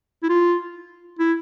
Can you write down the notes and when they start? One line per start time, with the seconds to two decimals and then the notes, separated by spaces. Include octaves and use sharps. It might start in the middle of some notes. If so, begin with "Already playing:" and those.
0.23 E4
0.29 F4
1.19 E4